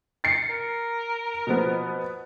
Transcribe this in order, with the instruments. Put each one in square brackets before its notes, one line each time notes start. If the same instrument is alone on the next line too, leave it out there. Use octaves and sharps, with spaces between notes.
[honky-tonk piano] A6 C7 C#7
[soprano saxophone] A#4
[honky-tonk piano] B2 F3 B3